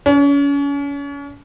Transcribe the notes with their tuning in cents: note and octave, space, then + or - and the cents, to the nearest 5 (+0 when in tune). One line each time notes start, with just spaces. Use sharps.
C#4 +35